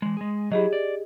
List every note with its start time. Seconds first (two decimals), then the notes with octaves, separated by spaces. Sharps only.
0.02 E3 G#3
0.17 G#3 G#4
0.52 F#3 E4 G4 G#4 D#5
0.73 D5